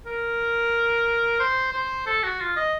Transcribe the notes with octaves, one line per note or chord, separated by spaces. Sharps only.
A#4
C5
C5
A4
F#4
F4
D#5